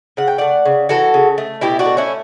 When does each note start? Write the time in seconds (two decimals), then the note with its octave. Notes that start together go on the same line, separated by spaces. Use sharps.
0.17 C#3 F#5
0.28 G5
0.38 A3 D5 F#5
0.65 C#3
0.89 E3 F#4 A4
1.14 C#3
1.38 A3
1.61 B2 E4 G4
1.79 D4 F#4
1.86 A3
1.97 C#4 E4